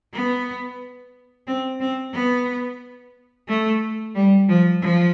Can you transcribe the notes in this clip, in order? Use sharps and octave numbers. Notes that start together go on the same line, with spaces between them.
B3
C4
C4
B3
A3
G3
F3
F3